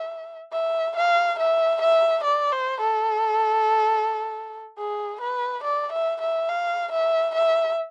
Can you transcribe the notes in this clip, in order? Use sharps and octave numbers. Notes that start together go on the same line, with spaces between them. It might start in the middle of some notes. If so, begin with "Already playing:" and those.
Already playing: E5
E5
F5
E5
E5
D5
C5
A4
G#4
B4
D5
E5
E5
F5
E5
E5